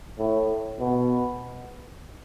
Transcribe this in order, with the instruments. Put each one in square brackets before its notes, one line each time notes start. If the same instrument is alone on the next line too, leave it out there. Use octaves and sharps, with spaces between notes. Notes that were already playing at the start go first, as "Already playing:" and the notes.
[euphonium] A2
B2